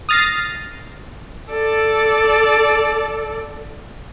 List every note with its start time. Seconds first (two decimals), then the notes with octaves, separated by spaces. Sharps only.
0.09 D#6 F6 A6 A#6 C7
1.52 A4 D5